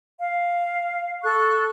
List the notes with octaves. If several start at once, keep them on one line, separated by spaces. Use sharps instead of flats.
F5
A4 C#6 F#6